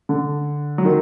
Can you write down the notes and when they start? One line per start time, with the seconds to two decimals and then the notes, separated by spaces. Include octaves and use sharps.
0.09 D3
0.78 F#3
0.85 D#3